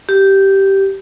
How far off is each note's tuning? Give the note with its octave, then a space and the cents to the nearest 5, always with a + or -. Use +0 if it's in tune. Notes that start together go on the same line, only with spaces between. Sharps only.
G4 -10